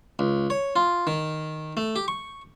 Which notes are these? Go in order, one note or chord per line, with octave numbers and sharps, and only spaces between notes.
C#2
C#5
F4
D#3
A3
G4
C#6